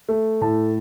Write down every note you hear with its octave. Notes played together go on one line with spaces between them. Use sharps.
A3
A2 A5